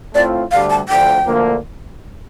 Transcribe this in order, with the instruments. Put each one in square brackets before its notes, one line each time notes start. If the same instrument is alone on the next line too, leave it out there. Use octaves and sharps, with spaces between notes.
[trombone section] A2 A3 C4 F4 [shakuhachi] D5
[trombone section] D2 D3 G3 D4 [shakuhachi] F5
[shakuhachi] A5
[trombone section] D2 D3 F3 [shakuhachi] G5
[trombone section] D2 D3 F3 A#3